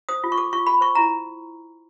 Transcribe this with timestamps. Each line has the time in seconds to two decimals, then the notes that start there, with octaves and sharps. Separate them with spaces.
0.09 C5 D#6
0.24 F4
0.32 C#6
0.38 A4 D6
0.53 F4 C#6
0.67 A4 B5
0.81 C5 C#6
0.95 E4 A#5